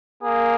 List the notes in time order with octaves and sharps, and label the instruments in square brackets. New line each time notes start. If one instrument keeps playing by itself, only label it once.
[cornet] A#3 [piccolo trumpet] G#4